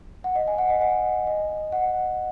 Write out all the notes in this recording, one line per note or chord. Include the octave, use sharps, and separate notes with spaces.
F#5
D#5
G#5
F#5
D#5
F#5
D#5
F#5